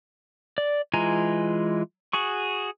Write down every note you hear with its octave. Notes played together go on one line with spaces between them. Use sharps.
D5
E3 G#3 F4 G#5 A#5
F#4 G#4 C#6